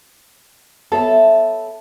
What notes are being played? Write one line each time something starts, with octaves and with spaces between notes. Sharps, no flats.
B3 A4 C#5 E5